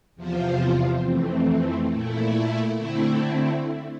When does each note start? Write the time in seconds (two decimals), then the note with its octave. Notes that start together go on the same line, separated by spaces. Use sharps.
0.16 E2 C3 F3 C4 F4
1.03 F2 E3 A3 C4
1.91 A#2 A3 E4
2.78 D3 A3 C4 E4